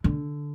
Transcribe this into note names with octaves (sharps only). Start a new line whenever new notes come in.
D3